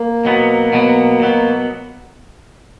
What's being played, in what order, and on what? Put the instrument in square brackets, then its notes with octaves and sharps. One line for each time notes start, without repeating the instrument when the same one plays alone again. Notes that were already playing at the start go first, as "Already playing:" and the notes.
Already playing: [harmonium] A#3
[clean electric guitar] B2 F#3 B3
B2 F#3 B3
B2 F#3 B3